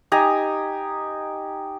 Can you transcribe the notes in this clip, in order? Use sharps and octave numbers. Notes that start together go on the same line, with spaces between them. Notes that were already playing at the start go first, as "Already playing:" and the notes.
D#4 G4 G#5 A#5